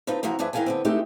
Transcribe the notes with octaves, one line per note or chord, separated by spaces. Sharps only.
D3 C4 D#4 F4 B4
C3 E3 F3 C4 F#4 A#4
G2 F3 D4 G#4 B4 E5
G#2 E3 A#4 F5 G5 G#5
D3 B3 C4
G#3 A3 C4 D#4 G4 E5